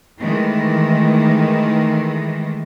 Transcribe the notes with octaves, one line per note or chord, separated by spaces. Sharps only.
D#3 E3 G#3 A3